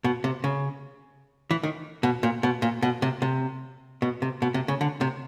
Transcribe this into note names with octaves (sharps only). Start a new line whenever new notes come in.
B2
C3
C#3
E3
D#3
B2
A#2
B2
A#2
B2
C3
C3
B2
C3
B2
C3
C#3
D3
C3